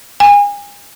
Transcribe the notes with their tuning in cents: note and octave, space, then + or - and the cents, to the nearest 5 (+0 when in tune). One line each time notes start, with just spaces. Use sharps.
G#5 -35